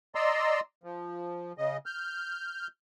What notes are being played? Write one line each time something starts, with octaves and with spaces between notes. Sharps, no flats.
D5 D#5 A#5 C6 E6
F3
C#3 D#5
F6 G6